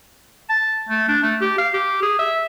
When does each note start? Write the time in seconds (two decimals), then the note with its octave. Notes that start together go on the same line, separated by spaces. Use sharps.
0.49 A5
0.89 A3
1.08 D4
1.23 A3
1.41 G4
1.58 F5
1.74 G4
2.02 G#4
2.19 E5